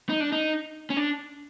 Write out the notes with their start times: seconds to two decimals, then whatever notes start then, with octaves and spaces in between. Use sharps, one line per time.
0.09 D#4
0.21 D4
0.32 D#4
0.90 C#4
0.97 D4